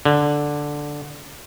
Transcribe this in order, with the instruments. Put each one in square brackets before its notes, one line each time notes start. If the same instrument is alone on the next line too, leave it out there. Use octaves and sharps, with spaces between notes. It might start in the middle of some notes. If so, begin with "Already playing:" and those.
[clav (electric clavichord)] D3